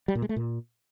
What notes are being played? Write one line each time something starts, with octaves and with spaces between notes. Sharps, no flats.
G3
A#2
G#3
A3
A#2